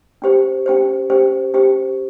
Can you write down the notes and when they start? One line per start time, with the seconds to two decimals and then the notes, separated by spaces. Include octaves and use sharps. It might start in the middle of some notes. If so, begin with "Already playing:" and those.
0.22 C#4 G4 C5
0.66 C#4 G4 C5
1.10 C#4 G4 C5
1.54 C#4 G4 C5